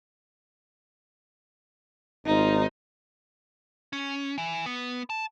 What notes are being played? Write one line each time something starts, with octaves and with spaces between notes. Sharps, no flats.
G#1 D#4 F4
C#4
E3
B3
A5